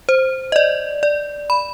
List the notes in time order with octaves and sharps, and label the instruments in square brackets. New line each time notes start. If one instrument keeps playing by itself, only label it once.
[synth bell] C5
D#5
D5
D5
B5